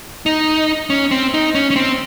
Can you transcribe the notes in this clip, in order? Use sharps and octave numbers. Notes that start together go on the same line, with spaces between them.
D#4
C#4
C4
D#4
C#4
C#4
C4